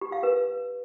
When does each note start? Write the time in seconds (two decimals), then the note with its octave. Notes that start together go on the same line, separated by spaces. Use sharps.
0.01 G4
0.12 F5
0.23 B4